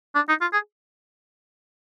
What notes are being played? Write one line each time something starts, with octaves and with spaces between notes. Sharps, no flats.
D4
D#4
F4
G#4